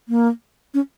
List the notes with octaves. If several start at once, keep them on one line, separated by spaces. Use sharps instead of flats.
A#3
C#4